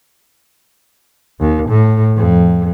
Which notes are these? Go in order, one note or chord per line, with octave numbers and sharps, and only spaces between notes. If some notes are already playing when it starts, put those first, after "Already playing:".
D#2
A2
F2